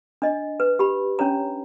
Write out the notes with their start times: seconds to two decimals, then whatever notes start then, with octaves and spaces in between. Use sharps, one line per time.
0.22 D4 D#5
0.60 B4
0.79 G4 B5
1.19 C#4 D4 C#5 A#5